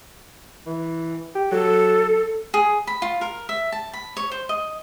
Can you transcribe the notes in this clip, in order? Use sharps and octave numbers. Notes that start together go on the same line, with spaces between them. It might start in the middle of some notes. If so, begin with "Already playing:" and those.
E3
G4
F#3 A4
G#4
B5
F4
A#4
E5
A5
B5
C#5
C5
D#5